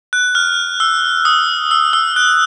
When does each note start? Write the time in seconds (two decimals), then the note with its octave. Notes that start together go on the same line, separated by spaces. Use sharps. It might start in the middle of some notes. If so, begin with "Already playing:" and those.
0.13 F#6
0.35 F6
0.80 E6
1.25 D#6
1.71 E6
1.93 E6
2.16 F#6